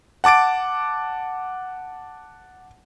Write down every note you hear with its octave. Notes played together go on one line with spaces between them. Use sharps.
F#5 A5 D6 A6 D7